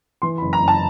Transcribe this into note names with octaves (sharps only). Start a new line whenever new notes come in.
E3 C6
B5
F#1
A#5
F#1 A5